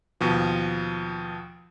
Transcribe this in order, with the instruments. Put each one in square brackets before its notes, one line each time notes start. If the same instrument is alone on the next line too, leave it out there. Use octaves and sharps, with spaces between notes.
[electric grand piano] D#2 B2 F3